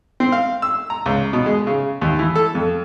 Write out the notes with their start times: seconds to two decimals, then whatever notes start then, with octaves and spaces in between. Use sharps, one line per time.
0.20 C4
0.32 F5
0.62 E6
0.90 A#5
1.06 C#2
1.33 B2
1.46 G#3
1.67 C#3
2.01 D#2
2.19 E3
2.36 A4
2.55 F2